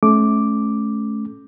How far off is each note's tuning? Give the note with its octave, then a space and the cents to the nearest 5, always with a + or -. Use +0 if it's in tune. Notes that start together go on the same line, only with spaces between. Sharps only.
A3 -25 C#4 +0 D6 +0